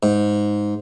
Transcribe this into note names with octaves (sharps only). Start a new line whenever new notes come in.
G#2